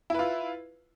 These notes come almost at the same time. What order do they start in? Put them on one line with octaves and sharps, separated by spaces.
E4 B4 F4